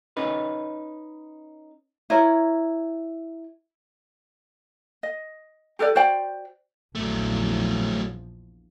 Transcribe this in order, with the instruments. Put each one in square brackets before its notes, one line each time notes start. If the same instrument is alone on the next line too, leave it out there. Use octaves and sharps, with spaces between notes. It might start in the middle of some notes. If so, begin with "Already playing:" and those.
[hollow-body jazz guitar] C#4 D#4 B4
[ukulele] E4 A#4 C#5
D#5
G4 A4 B4 D5
F#4 C5 D5 G5
[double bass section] A#1 E2 F3 [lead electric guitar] F#3 A3